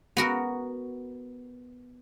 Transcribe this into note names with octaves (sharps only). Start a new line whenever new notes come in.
B3 F#4 A#4